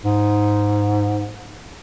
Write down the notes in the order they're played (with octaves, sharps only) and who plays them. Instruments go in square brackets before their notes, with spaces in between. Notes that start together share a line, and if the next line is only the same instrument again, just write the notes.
[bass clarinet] G#2